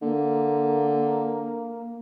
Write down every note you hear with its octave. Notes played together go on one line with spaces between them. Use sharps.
D3 A#3